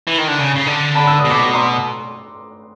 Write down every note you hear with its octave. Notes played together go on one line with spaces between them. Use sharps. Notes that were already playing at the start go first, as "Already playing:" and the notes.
E3
D#3
D3
C#3
C#3
D3
A5 B5
E6
D#6
B2
D6
C#6
A#5 C6